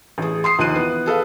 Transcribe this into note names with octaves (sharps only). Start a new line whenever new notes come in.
A1 G#4
C6 D#6 C7
D#2 F3 F#6 D#7
E3 B3
G#4 A4 B4 F5